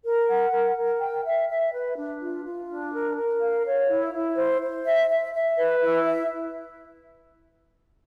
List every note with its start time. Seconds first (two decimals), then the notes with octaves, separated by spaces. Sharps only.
0.04 A#4
0.29 F#5
0.52 A#4
0.76 A#4
1.00 G5
1.24 E5
1.49 E5
1.72 B4
1.96 D4
2.21 F4
2.45 F4
2.69 D4
2.92 A#4
3.16 A#4
3.40 F5
3.65 C#5
3.89 E4
4.13 E4
4.36 C5
4.61 C5
4.86 E5
5.09 E5
5.33 E5
5.57 B4
5.81 E4
6.05 E5